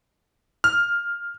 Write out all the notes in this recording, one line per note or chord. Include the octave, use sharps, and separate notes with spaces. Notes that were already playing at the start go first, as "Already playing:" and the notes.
F6